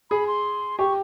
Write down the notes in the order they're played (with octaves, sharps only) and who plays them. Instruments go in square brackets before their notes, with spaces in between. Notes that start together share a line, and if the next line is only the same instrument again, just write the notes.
[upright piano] G#4 [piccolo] B5
[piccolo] C6
[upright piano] G4 [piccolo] C#6